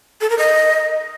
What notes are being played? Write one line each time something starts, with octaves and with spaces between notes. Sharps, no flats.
A4
A#4
D#5